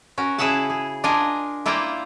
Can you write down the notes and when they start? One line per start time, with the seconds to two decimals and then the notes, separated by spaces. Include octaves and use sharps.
0.18 C#4 F#4 A#4
0.39 C#3 E4 G#4 E5 F#5 A5
0.70 G#4
1.04 D4 F4 A#4 D#5 G#5
1.66 A#3 E4 F4 D5 G5 A#5